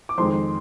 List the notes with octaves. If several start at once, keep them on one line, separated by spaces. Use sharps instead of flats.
D6
F2 D#3 G#3 C5 C6